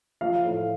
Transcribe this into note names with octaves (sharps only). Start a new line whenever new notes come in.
F3 F5
A2